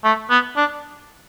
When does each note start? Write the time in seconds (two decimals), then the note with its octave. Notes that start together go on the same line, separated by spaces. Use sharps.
0.04 A3
0.30 B3
0.56 D4